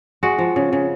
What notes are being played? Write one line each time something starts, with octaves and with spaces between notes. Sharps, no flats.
G#3 F#4
F3
C#3
C#3